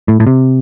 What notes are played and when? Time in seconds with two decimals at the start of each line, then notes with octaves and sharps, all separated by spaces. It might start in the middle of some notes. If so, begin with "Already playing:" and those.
0.08 A2
0.20 A2
0.27 C3